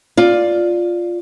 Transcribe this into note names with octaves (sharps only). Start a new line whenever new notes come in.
F4 D5